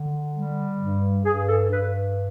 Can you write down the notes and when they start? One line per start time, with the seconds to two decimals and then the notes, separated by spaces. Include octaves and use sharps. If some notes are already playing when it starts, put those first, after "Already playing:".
Already playing: D3
0.33 G3
0.79 G2
1.25 G2 G#4
1.48 A4
1.71 G2 B4